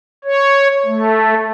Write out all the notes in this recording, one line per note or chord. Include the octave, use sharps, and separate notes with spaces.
C#5
A3